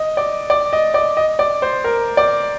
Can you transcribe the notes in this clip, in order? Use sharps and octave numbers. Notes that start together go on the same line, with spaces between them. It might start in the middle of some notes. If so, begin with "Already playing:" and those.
Already playing: D#5
D5
D5
D#5
D5
D#5
D5
C5
A#4
D5